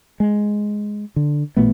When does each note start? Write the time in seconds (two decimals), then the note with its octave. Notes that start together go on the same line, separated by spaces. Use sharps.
0.20 G#3
1.16 D3
1.57 A1 A#2 A3 B3